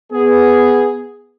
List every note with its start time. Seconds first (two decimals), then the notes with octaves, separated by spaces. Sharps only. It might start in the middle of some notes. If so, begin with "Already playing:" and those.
0.13 B3 G#4